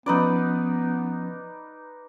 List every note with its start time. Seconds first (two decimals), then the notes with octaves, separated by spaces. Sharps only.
0.06 F3 B3 C#4 D#4 B4 D5